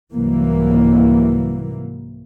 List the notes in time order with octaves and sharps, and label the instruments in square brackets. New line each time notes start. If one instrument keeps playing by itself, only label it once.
[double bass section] C2 G#2 E3 F#3 A#3